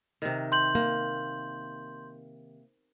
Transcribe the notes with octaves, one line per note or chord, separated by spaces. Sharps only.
C3 D#3
C6 G6 F#7
A#3